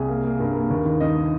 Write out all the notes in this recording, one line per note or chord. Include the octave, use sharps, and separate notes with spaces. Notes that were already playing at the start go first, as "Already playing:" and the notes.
Already playing: C2 G#4
A#3
A#3
G2 A#3 A#4
A#3
D#2
D#3
D#3 D#4 D#5